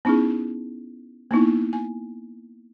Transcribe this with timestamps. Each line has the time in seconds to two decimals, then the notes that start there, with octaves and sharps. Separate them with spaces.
0.05 B3 C#4 D#4 E4 G#4
1.31 A#3 B3 D#4 E4
1.73 G#5